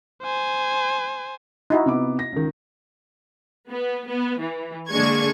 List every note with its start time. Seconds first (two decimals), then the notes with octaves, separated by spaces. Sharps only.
0.23 C5 G#5
1.70 D#4 E4 F#4
1.86 C3 B3 D6
2.19 A#6
2.32 C#2 D#3
3.70 B3
4.08 B3
4.40 E3
4.90 D3 G#3 A#3 D4 C#6 G#6